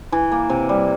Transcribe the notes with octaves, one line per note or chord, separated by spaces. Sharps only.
E3
A#3
C3
G3